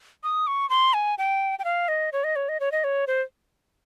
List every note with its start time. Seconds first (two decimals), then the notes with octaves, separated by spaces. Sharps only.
0.23 D#6
0.47 C#6
0.70 C6
0.94 G#5
1.18 G5
1.59 G5
1.64 F5
1.88 D#5
2.13 C#5
2.24 D#5
2.36 C#5
2.49 D#5
2.60 C#5
2.72 D#5
2.84 C#5
3.07 C5